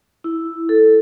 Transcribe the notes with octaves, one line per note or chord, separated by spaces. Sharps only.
E4
A4